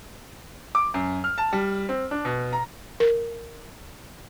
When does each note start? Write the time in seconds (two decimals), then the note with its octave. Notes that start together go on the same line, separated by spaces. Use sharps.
0.75 D6
0.94 F#2
1.24 F6
1.38 A5
1.53 G3
1.89 C4
2.11 D4
2.25 B2
2.53 A#5
3.00 A#4